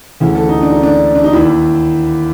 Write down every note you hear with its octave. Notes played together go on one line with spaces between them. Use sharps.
D2 C#3 E3
A4
D#4
D4
D#4
D4
D4
D#4
D#2 D#3 E4